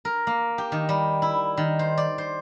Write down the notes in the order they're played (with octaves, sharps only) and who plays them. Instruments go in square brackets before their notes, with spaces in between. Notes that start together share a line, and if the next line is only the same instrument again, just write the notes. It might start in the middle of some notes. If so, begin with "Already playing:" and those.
[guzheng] A#4
A#3
G4
D#3
G3
E4
D#3
C5
D5
C5